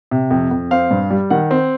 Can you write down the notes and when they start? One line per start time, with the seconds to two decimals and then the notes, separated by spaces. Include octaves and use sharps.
0.11 C3
0.31 F2
0.51 F2
0.71 C4 F5
0.91 G2
1.10 G3
1.30 D#3 F#5
1.51 C4